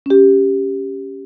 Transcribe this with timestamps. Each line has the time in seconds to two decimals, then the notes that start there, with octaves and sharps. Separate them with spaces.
0.06 C#4 G4